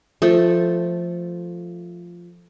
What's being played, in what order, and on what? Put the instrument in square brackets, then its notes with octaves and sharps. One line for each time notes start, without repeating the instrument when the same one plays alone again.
[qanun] F3 A3